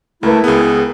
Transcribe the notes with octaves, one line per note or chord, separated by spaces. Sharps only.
C#2 A3 E4 A#4 B4
C#2 B3 G#4